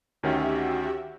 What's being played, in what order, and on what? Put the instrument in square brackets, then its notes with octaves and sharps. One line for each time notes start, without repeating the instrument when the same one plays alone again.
[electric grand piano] D2 D#3 C#4 [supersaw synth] F#4 G4 E5